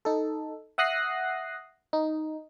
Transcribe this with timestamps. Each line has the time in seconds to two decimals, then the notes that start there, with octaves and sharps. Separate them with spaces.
0.05 D#4 A4
0.78 E5 F#5 D#6 F#6 A#6 C7
1.93 D#4